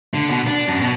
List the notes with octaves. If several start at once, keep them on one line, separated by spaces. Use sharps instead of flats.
D3
B2
D4
F#2
B2